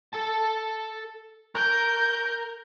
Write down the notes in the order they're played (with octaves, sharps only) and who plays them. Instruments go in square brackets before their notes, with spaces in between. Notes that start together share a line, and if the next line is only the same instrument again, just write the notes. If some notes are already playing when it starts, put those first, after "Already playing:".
[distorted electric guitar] A4 A5
[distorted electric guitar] A#4 [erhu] G6